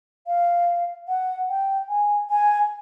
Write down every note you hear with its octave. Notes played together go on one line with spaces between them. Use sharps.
F5
F#5
G5
G#5
G#5